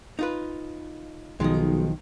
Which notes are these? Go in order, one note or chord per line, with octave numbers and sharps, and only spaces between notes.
D#4 F4 B4
B1 D#3 F3 G#3 D#5